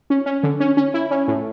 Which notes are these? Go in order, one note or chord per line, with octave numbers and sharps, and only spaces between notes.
C#4
C#4
D3
C#4
C#4
E4
C#4
A2